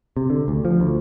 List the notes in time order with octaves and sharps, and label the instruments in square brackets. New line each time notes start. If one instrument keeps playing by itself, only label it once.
[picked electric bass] C3
D3
D2
F3
D2